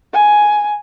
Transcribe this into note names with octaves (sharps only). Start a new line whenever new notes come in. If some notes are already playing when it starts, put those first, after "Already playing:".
G#5